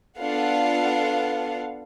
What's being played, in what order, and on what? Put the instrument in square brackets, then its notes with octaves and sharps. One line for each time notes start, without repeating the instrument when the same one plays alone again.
[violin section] B3 D4 F4 A4 F5 F#5